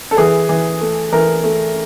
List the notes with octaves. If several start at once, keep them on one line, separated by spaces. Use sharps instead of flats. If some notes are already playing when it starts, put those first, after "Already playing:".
A4
E3 G#4
E3
A3
E3 A#4
A3